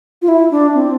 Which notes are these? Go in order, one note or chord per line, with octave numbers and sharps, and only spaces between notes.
F4
E4
D4
C4